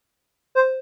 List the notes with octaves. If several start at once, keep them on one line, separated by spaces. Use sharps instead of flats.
C5